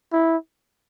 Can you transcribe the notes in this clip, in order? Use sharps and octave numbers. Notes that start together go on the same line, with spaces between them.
E4